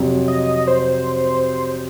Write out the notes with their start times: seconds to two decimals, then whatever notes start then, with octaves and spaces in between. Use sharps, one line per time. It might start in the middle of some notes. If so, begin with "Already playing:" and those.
Already playing: F2 C3 F#3
0.28 D#5
0.67 C5